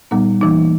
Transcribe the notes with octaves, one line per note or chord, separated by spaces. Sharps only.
A#2 G3 B3 D#4
E3 A#3 D#4